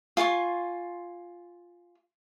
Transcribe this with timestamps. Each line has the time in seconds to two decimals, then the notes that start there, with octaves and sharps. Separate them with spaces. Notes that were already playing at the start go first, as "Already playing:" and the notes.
0.17 F4 G#5 C6 C#6